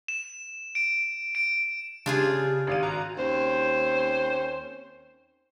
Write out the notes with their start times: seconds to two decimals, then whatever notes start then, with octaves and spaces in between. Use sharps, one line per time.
0.08 E7
0.75 D7
1.35 D7
2.06 C#3 D4 F4 G4 G#4
2.67 G#1 F5 D#7
2.83 F#4 A#5
3.17 D#2 C4 C#4 C5